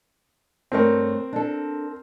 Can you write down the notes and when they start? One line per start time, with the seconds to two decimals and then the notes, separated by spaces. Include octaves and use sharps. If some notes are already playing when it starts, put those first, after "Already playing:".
0.72 G2 A3 C4 A#4 C#5
1.33 D4 A4